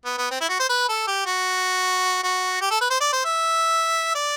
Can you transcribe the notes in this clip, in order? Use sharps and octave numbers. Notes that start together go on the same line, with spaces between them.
B3
B3
C4
E4
F#4
C5
B4
A4
G4
F#4
F#4
G4
A4
B4
C5
D5
C5
E5
D5